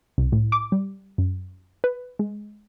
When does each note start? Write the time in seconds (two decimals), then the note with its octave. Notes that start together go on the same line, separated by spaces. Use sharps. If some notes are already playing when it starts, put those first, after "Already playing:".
0.18 C2
0.32 A2
0.52 D6
0.72 G3
1.18 F#2
1.84 B4
2.19 G#3